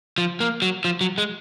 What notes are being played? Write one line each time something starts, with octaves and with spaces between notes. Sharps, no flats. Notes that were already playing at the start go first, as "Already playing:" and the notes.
F3
A#3
F#3
F3
F#3
G#3